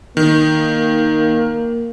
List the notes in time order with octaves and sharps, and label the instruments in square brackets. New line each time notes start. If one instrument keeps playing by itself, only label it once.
[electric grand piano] D#3 [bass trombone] A#3